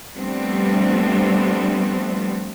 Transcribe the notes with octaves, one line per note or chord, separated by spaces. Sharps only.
F3 G3 A3 B3 C4 D4